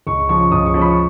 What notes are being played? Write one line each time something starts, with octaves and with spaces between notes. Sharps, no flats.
C#2 C#6
C#3 F3 C#6
C#2 D#6
C#6
C#3 F3
B5
C#6